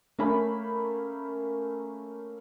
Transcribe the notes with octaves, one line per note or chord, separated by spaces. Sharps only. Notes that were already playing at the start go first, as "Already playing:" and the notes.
A3 A#3 C#4 B5